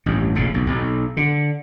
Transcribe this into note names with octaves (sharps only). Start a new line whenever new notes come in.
A1 G2
F1 A#2 C#3
B1
B1
D3